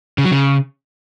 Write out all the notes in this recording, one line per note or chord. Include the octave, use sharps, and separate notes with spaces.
C#3
F#3
C#3